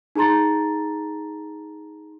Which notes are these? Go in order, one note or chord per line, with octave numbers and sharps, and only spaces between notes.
D#4 G#4 A5 A#5 C6 A6